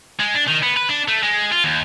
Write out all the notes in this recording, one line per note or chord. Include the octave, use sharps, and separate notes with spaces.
G#3
D4
D#3
B3
B4
D4
A3
G#3
F4
D#2